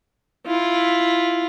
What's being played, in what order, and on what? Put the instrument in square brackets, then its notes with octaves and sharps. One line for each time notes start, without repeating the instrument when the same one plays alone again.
[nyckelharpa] E4 F4